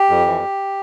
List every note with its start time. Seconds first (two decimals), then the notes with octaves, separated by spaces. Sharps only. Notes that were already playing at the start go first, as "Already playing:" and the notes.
Already playing: G4
0.10 F2
0.26 E3